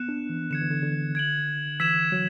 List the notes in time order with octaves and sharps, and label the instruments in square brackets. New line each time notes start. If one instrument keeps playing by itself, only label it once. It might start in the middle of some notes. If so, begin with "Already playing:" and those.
Already playing: [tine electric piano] B3 [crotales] F#6 C#7 E7
[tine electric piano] D4
E3
[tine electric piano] D3 [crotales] G#6 C#7 E7
[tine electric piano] E3
D3
D3
[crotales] G#6 D7 F#7
[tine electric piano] E3 [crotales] E6 G#6 B6 E7
[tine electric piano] F#3